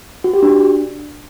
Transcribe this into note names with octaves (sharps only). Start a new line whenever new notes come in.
F#4
G4
D4